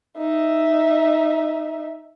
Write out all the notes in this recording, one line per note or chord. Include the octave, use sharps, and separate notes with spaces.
D#4 E5